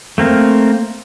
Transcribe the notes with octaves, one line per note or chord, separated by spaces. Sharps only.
A3 A#3 C4 A#4